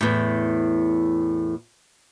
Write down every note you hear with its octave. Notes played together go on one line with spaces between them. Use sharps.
E2 A2